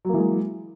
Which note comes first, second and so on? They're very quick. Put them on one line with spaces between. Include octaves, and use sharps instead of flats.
F#3 A#3 E3 G#3